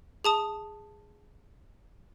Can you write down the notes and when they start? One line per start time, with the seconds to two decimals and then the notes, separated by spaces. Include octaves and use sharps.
0.24 G#4 A5 D#6